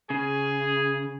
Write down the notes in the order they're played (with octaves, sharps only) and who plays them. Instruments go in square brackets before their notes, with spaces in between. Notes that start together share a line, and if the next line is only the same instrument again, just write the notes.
[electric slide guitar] C#3 [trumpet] G#4